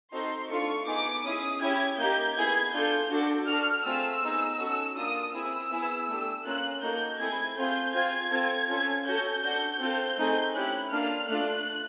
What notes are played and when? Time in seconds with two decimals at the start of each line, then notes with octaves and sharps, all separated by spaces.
0.13 C4 D#4 F#4 A4 C6
0.50 A3 D4 F4 A4 C#6
0.87 B3 D#4 G#4 D6
1.24 C#4 E4 G#4 D#6
1.62 C#4 E4 G4 G#6
1.99 A#3 D#4 G4 G6
2.36 B3 E4 G#4 G#6
2.73 D4 F4 A4 G6
3.11 D4 F#4 A4
3.47 D4 F#4 A4 F6
3.85 A3 C4 F4 G#4 E6
4.22 B3 D#4 G#4
4.59 C#4 F#4 A4
4.96 A#3 D4 F4 D#6
5.33 C4 E4 G#4 E6
5.71 B3 E4 G#4
6.08 A3 D4 G4
6.45 A#3 C#4 F4 F#6
6.82 A#3 D#4 F#4 A4 G6
7.20 A3 C4 E4 G#4 G#6
7.57 A3 C4 F4 G#4 G6
7.94 C4 F4 G#4 G#6
8.31 C4 F4 A4
8.68 C#4 F4 A4
9.06 C#4 F#4 A4 G6
9.42 D4 F#4 A4 G6
9.80 C4 F4 A4
10.17 A3 C4 D#4 G#4
10.54 C#4 E4 G4 F#6
10.92 A#3 D4 F4 A4 F6
11.29 A3 D4 F4 F#6